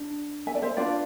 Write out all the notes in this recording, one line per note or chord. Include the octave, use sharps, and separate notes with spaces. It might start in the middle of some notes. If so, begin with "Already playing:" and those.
Already playing: D4
E5 G#5
D5
C5 E5
D4 F4 B4 D5 F5